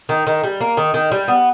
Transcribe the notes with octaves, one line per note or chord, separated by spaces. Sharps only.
D#3
D#3
G3
A#3
D#3
D#3
G3
B3